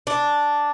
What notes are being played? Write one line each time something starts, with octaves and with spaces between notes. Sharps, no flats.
D4